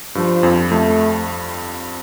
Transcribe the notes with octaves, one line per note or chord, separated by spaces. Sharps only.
G2 F3
F2
F2 A3